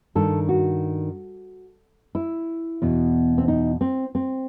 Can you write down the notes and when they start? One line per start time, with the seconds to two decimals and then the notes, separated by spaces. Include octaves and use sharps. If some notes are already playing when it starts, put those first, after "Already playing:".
0.15 G2 D#3 A4
0.49 F#4
2.15 E4
2.82 E2 B2
3.38 C4
3.48 D#4
3.81 C4
4.15 C4